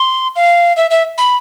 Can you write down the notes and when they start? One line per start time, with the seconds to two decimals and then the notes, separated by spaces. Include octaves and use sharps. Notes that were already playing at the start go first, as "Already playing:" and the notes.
Already playing: C6
0.36 F5
0.77 E5
0.91 E5
1.18 B5